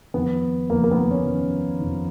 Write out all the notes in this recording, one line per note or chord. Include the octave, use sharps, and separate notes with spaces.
F2 D#3 B3
F2 D#3 A#3
A#3
B3
A#3
C#4
F2 D#3
F2 D#3